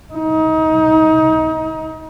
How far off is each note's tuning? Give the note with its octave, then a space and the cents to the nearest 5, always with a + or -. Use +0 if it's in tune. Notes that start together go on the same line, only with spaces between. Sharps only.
D#4 +30